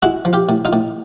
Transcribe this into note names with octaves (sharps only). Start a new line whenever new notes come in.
G#3 E4 F#4
F3
F4 G4
A2
D#4 F4
A2